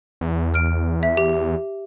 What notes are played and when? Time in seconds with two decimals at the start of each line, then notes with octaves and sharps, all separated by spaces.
0.21 E2
0.54 F6 D7
1.03 E5
1.17 G4